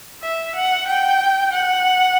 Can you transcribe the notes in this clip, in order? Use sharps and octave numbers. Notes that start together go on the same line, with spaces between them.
E5
F#5
G5
F#5